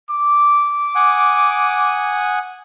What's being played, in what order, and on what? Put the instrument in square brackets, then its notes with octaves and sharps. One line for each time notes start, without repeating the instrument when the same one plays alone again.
[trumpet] D6
[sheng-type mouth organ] F#5 G#5 D#6